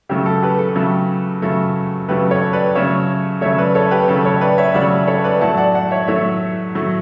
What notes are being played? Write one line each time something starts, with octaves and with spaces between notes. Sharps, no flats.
C#3 F#3 A3 G4
A4
G4 B4
A4
C#3 F#3 A3
C#3 F#3 A3
C#3 F#3 A3 G4 B4
A4 C#5
B4 D5
C#3 F#3 A3 C#5 E5
C#3 F#3 A3 C#5 E5
B4 D5
A4 C#5
G4 B4
C#3 F#3 A3 A4
A4 C#5
B4 D5
C#5 E5
C#3 F#3 A3 D5 F#5
A4 C#5
B4 D5
A2 F#3 A3 F#5 A5
D5 F#5
D5 F#5
C#5 E5
A2 F#3 A3 C#5 E5
A2 F#3 A3